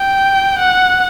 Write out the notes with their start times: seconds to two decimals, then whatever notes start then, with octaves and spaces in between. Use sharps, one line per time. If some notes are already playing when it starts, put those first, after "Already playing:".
Already playing: G5
0.59 F#5